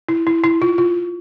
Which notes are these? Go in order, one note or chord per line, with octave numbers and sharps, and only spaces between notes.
E4
E4
E4
F4
F4